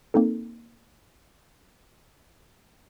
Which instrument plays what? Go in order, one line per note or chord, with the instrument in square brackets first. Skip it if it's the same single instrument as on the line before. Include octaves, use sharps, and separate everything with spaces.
[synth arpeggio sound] A#3 C4 D#4 A4